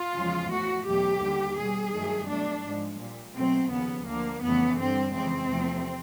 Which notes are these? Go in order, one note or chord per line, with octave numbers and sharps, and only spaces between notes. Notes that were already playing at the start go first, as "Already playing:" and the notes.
Already playing: F4
E2 C#3 F3 G#3
A2 F3 A3 F#4
E2 B2 F#3 A3 G4
D#2 D3 G3
B2 G3 G#4
G2 D#3 F#3 A3
B2 F#3 A3 D4
G#2 F3 G#3
A#2 G3
B2 F#3 A3 C4
D#2 C#3 F3 B3
D2 D3 F3 A#3
F2 C#3 E3 A3 B3
G2 D3 G3 C4
F2 C#3 E3 G#3 C4
E2 C3 F3 A3